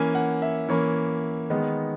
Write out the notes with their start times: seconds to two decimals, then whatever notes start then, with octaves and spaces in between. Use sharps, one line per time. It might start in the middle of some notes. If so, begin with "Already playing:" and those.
Already playing: E3 A#3 C#4 G#5
0.15 F#5
0.42 E5
0.69 E3 A#3 C#4 C#5
1.50 D#3 G#3 B3